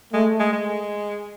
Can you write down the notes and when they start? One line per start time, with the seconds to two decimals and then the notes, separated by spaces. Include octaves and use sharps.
0.13 G#3 A3
0.40 G#3
0.53 G#3